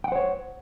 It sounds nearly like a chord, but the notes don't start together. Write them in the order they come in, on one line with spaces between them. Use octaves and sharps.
G5 F#5 C5 C#5